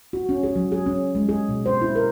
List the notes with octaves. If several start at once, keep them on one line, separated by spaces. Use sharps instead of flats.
F#4
C#4
G#4
F#3
G#4
C#4
G#3
G#4
B2
C5
E4
A#4